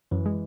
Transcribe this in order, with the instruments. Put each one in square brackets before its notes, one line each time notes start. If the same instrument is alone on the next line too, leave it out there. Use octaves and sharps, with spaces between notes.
[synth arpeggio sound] F#2 [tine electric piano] E3
[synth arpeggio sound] G#3